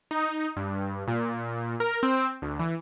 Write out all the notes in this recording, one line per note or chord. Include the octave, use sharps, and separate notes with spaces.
D#4
G2
A#2
A#4
C4
D2
E3